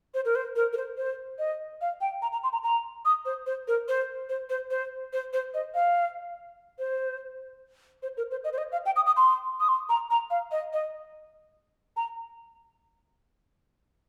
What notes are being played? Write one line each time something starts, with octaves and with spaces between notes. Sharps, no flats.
C5
A#4
C5
A#4
A#4
C5
C5
D#5
F5
G5
A#5
A#5
C6
A#5
A#5
D#6
C5
C5
A#4
C5
C5
C5
C5
C5
C5
D#5
F5
C5
C5
A#4
C5
D#5
C5
D#5
F5
G5
D#6
D#6
C6
D#6
C6
A#5
A#5
F5
D#5
D#5
A#5